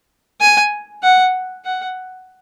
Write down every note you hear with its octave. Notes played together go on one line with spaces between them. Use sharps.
G#5
F#5
F#5